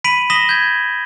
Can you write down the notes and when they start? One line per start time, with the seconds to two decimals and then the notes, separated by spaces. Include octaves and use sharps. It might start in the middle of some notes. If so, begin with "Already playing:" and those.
0.04 B5 B6 D7 D#7 F#7
0.30 D#6 A#6 B6 E7 F#7 G7
0.49 G6 G#6